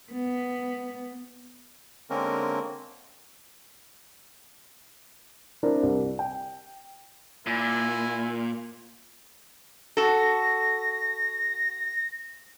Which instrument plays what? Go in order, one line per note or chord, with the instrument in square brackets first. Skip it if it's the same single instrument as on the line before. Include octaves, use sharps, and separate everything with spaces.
[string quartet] B3
[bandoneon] D3 G#3 A#3 C4 C#4 A#4
[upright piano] C4 D4 E4 A#4
C2
G5
[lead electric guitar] A#2 [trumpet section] E4 A#4 G#5
[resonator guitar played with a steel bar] F#4 A4 [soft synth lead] A#6